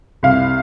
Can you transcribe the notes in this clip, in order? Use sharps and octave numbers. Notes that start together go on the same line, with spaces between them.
C2 F5